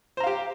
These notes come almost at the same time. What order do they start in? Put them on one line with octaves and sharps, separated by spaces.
C5 A#5 F5 G4